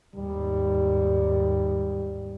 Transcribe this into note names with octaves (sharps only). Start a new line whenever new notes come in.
D#2 G#2 G3